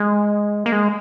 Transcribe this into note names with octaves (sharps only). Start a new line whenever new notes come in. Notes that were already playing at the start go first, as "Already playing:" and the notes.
Already playing: G#3
A#3
G#3